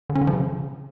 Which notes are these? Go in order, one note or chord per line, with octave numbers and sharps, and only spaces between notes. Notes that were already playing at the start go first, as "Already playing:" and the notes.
D3
C#4
D3
F3
C#3